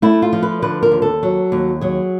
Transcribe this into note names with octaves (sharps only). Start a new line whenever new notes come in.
A3 E4
F4
F3
B4
D3 B4
A#4
D#2
A4
F#3
D#2
F#3 G#4